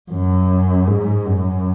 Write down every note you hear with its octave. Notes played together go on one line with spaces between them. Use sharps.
F#2
G#2
F#2